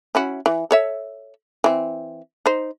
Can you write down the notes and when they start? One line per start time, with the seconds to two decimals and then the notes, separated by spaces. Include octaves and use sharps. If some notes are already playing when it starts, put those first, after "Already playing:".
0.15 C#4 E4 F#4
0.46 E3
0.71 A4 C#5 E5
1.64 E3 C4
2.46 D#4 C5